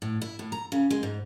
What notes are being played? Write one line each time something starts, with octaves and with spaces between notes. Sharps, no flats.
A2
E4
A2
A#5
C#3
G#3
G#2